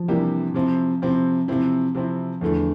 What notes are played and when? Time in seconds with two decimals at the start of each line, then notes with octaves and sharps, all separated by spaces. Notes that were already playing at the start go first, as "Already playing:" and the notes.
Already playing: F3
0.08 C3 E3 G3 A#3 D4 G4
0.54 C3 F3 C4 E4
1.02 C3 F3 C4 E4
1.48 C3 E3 F3 C4 E4
1.95 C3 F3 C4 E4
2.41 E2 D3 F3 A3 E4